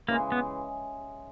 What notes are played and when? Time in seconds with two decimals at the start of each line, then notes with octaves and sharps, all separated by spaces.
0.09 C#3 E3 G#3 A#3
0.32 B3